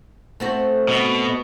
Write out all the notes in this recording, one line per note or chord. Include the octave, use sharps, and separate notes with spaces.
A3 C4 F#4
B2